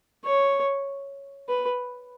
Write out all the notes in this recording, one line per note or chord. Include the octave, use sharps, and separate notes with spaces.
C#5
B4